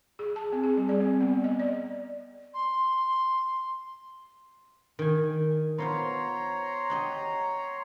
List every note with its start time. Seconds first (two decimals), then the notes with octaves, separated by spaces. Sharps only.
0.19 G#4
0.36 A5
0.52 C4
0.64 G#4
0.77 G3
0.89 D5
1.00 C4
1.21 B3
1.44 D#5
1.60 D5
2.54 C6
4.99 D#3 G#5
5.78 B3 F4 C5 C#5 A#5 C6
6.90 G4 D#5 F#5